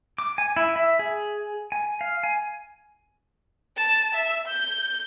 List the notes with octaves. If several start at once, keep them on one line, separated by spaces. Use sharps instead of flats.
D6
G#5
E4
E5
G#4
G#5
F5
G#5
A5
E5
G6